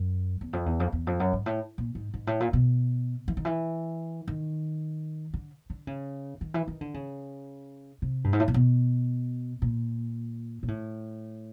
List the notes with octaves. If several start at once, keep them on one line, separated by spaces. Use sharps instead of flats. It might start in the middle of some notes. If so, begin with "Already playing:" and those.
Already playing: F#2
E2
F2
E2
F2
E2
F2
F#2
G#2
A2
A#2
G#2
G#2
A2
A#2
B2
E3
D#3
E3
D#3
D3
D3
C#3
D#3
E3
D#3
D3
C#3
C3
G2
G#2
A2
A#2
B2
A#2
A#2
A2